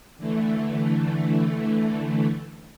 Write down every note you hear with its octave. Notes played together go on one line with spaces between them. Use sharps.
D3 E3 A3